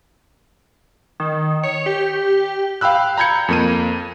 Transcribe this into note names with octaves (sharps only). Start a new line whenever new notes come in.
D#3
C#5
G4
F5 G5 B5 E6 F#6
A#5 B5 G6 G#6 C#7
F2 A#3 D#7